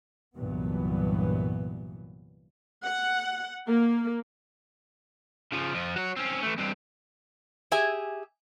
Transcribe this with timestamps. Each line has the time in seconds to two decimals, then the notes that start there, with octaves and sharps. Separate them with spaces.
0.37 C2 G2 A#2 E3 F#3 B3
2.85 F#5
3.67 A#3
5.52 C#3 F3
5.74 F2 F3
5.96 F#4 C#5
6.17 C4 C#4
6.43 E3 A3
6.58 G2 C4
7.72 G4 G#4 E5 G#5